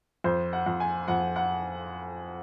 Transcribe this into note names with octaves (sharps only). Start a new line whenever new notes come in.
F2 C5
F#5
F2
G#5
F2 F#5
F#5